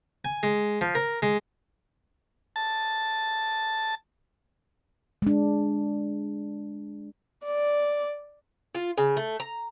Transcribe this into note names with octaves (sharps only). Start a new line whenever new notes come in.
G#5
G#3
F3
A#4
G#3
A5
G#3 D4
D5
F4
C#3
A3
A#5